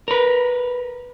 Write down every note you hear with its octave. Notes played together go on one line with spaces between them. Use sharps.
A#4 B4